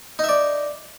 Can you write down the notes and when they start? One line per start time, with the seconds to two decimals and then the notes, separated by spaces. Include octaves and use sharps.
0.19 D#4
0.24 E5
0.29 D5